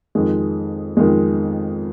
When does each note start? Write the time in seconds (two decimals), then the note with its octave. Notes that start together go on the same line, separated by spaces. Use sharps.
0.15 F2 D#3 G#3
0.97 F2 D#3 G#3